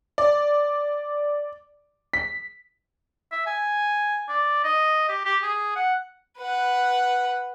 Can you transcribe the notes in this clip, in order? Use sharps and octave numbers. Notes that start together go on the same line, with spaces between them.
D5
B6
E5
G#5
D5
D#5
G4
G4
G#4
F#5
B4 F#5